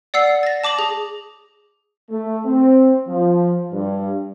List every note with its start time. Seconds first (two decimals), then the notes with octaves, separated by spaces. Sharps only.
0.14 D5 F#5 E6 C7
0.43 A6 A#6
0.64 A5 D6 A#6 F#7
0.79 G#4
2.10 A3
2.44 C4
3.08 F3
3.72 G2